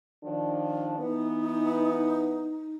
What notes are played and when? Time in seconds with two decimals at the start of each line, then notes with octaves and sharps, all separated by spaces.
0.24 D#3 F3 D4
0.98 E3 B3 D#4